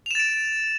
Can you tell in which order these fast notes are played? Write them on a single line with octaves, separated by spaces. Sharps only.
F7 E7 A6 D7